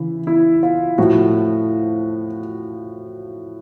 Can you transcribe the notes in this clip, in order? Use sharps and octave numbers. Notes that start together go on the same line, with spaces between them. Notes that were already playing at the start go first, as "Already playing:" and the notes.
Already playing: C#3 E3 E4
E4
F4
A2 F3 F#4